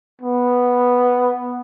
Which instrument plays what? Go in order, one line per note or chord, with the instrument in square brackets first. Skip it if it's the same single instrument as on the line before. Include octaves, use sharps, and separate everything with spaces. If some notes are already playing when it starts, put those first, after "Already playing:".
[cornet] B3